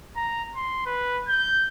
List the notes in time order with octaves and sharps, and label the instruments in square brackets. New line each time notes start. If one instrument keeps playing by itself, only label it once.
[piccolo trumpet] A#5
C6
B4
G6